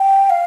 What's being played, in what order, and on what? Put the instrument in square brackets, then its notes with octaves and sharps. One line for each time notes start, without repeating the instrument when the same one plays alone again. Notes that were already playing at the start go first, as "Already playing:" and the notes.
Already playing: [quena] G5
F5